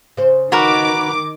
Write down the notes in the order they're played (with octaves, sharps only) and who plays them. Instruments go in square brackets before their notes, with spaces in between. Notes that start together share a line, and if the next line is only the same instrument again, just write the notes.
[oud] C#3 C5
[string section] D#3 D6 [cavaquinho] F#4 A#4 B4